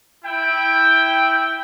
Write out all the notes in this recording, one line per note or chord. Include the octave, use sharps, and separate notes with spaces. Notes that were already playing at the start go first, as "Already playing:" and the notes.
E4 G5